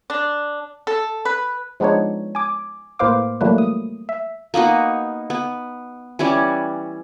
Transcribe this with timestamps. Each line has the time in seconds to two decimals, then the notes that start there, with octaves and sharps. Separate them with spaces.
0.10 D4
0.87 A4
1.25 B4
1.80 F3 G#3 B3 D4 D#4 C#5
2.35 G#5 D6
2.99 A2 A#3 B4 C5 F5 D6
3.41 E3 F#3 G3 A3 A#3 B4
3.58 D#6
4.09 E5
4.54 A#3 B3 D#4 F#4
5.30 B3
6.19 E3 G3 C#4 D5